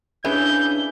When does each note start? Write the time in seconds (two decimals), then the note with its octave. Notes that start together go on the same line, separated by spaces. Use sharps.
0.25 C#3 E3 C#4 D4 G#4 E5 G6